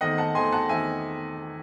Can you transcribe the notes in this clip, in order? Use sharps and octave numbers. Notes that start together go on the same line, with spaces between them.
E2 D#3 A3 C4 D#5 F#5
F#5 A5
E2 D#3 A3 C4 G#5 C6
F#5 A5
E2 D#3 A3 C4 E5 G#5